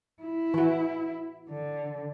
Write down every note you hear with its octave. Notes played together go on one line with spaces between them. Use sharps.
E4
E3 F#4
D3